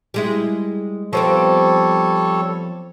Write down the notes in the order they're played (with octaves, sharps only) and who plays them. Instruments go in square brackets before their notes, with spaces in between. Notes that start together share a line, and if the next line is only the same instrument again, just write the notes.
[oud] G3 G#3 E4
[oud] F3 B3 C4 [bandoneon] G3 A4 C#5